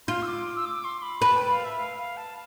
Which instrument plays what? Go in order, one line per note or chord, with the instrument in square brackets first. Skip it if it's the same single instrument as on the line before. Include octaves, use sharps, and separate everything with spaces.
[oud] F4 [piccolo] C6
[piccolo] E6
D6
E6
D6
C6
B5
[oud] B4 [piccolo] A5
[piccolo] G5
F5
E5
F5
F5
A5